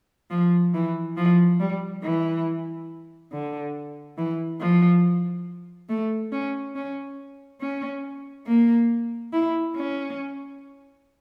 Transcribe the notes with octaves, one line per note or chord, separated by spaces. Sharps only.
F3
E3
F3
G3
E3
D3
E3
F3
A3
C#4
C#4
C#4
A#3
E4
C#4